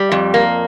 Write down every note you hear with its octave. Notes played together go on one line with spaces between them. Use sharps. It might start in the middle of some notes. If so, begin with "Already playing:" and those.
Already playing: G3
F2
A#3